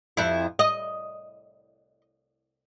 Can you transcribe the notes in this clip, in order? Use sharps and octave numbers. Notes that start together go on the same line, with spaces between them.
F2 E4
D#5